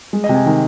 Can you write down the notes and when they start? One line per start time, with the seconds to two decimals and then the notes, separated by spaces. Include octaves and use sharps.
0.13 G#3
0.24 D#5
0.29 C3
0.35 G#5
0.46 D#3